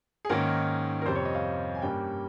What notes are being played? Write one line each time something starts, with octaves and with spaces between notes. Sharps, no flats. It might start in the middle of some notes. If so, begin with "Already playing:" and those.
G#4
G#2 D#3 A#3 C#4 A#4
A#4
F2 C3 G3 C5
C#5
D#5
F5
G#5
G2 G3 A#3 C#4 G5